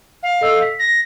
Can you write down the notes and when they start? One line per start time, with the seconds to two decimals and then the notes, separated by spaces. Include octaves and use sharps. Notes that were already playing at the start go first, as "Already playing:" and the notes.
0.23 F5
0.41 A4 D#5 E6
0.62 B6
0.79 A#6